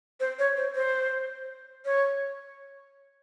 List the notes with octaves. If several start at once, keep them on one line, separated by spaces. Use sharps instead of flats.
C5
C#5
C5
C5
C#5